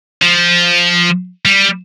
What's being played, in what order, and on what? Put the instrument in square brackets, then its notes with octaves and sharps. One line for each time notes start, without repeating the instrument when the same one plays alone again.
[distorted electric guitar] F3
G3